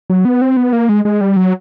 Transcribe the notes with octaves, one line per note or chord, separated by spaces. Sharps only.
F#3
B3
C4
B3
A#3
G#3
G#3
G3
F#3